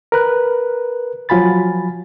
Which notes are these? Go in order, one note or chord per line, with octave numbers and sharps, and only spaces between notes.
A#4 B4 F#6
F3 F#3 F4 G#5 B5 A6